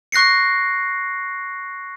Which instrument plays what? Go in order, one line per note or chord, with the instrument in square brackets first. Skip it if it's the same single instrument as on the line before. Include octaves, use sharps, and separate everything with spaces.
[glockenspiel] C#6 F#6 A#6 C7 C#7